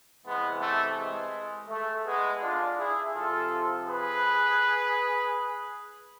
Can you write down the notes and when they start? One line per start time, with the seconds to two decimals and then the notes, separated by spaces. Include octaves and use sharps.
0.25 C3 E3 G#3 B3
0.61 A3
0.97 G#3
1.69 A3
2.06 G#3 B3
2.42 D4 F4
2.78 E4 G#4
3.14 C3 F3 F4 A4
3.87 G#4 B4